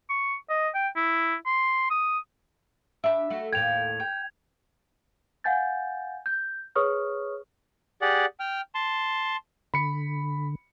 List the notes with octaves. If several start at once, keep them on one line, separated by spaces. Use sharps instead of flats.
C#6
D#5
G5
E4
C6
D#6
D4 G4 E5 B5
A3 F#4
D#2 A2 A#3 G5 G#6 F7
G5
F5 F#5 G#5 G6 A6
G6
G#4 B4 C#5 C#6 D#6 F6
G4 G#4 D5 F#5
G5 F6
A5 C6
D3 B5 C#7